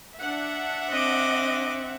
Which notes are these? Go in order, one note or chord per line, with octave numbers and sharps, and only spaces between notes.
D4 E5 F#5
C4 D#5 D6